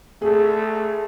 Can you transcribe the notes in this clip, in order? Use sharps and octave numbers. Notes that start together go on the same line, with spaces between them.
A3 G#4